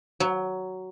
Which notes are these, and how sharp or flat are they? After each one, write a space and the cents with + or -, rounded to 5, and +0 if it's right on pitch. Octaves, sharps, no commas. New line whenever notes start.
F#3 +10